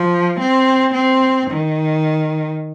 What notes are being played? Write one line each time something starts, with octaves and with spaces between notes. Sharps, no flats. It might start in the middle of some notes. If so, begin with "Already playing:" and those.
Already playing: F3
C4
C4
D#3